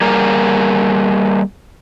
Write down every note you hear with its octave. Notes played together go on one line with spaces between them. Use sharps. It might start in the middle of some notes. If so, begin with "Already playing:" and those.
G3 A#3 G#4 A#4